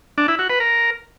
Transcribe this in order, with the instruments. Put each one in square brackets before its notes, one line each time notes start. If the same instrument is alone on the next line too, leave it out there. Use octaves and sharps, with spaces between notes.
[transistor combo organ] D4
E4
F#4
B4
A#4